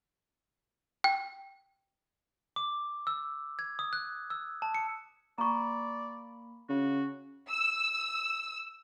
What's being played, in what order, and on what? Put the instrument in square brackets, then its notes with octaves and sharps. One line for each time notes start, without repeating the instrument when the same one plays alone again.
[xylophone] G5
[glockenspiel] D6
E6
G#6
D#6
F#6
E6
A5
C#7
[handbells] A#3 B5 [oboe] D5 [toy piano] A#5 C#6
[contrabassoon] C#3 [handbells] C#4 [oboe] F#4
[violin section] E6